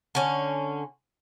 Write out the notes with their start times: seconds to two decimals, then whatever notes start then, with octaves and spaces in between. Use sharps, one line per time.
0.15 D3 C#4